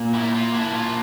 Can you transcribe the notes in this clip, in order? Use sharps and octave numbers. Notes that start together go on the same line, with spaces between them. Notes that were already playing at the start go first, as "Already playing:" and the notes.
Already playing: A#2
A#3 E4
F4
D4 E4
F4